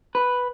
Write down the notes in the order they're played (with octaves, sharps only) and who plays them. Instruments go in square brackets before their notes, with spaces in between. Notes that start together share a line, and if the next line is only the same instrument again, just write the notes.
[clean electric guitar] B4